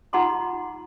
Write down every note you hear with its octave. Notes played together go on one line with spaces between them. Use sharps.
D#4 F4 F#5 A#5 C6 D6